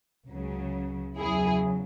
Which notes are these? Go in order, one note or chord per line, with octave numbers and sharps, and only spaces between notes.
C#2 C#3 F#3
E2 C#3 F#3 E4 G#4